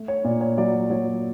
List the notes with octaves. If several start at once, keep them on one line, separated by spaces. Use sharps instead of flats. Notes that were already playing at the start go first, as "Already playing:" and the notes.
Already playing: A3
C#5
A#2 D5
C#5
F#3 D5
F#3 C#5